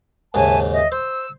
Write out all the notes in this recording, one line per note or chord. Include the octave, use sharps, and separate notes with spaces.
D#2 G#2 C#3 E5 G#5 A5
D#5 E5
C5 E6